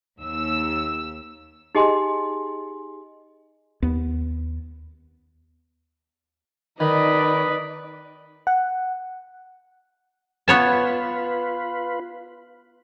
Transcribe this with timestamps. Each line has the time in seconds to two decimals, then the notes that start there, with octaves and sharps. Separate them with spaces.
0.19 D#2 E6
1.75 D#4 G4 G#4 D#5 G#5 C6
3.82 D#2 B3
6.80 D#3 D#4 B4 D5 D#5 B5
8.47 F#5
10.48 B3 F4 B4 C#5 A5